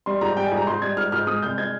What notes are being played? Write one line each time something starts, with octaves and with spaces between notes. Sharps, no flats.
G3 C6
G#2 A#5
G3 G5
G#5
G#2
A#5
G#2 C6
G3 G#6
G#2 F6
G#2 F6
G#3 D#6
C2 G6
G#3 G#6